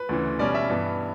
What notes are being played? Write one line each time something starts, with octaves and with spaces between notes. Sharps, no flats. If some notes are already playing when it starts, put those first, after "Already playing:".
Already playing: B4
D2 C#3 E3
B2 G3 C#4 D5
E5
G2 E3 B3